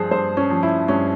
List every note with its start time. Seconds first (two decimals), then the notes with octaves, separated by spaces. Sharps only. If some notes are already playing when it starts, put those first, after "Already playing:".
Already playing: G2 F3 G#4 C5
0.11 G2 C5
0.37 C#4
0.50 F3
0.63 E4
0.88 G2 C#4